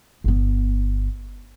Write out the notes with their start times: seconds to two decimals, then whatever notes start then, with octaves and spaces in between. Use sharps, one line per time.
0.24 G1 B3